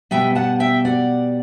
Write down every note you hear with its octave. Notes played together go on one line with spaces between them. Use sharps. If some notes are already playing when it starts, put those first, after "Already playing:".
B2 G3 B3 E5 G5
F#5 A5
E5 G5
D5 F#5